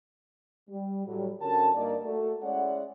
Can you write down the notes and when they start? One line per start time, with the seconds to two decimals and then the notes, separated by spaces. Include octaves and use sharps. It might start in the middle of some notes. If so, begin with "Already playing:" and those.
0.68 G3
1.06 A2 F#3 G3
1.40 D3 C#4 F#4 A#4 A5
1.74 G2 A#3 D#4 A#4 D5
2.03 A3 F#4 A4
2.42 G#3 C#4 E4 C#5 D5 F#5